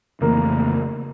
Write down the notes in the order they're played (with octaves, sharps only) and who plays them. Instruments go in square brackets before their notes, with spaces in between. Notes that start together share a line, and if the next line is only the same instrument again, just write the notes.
[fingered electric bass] F2 C#3 E3 A3 [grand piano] A#3